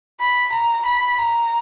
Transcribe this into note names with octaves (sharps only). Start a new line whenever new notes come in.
B5
A#5
B5
A#5